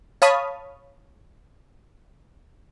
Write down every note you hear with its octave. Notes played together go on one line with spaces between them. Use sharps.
C#5 F5 A5 B5 D#6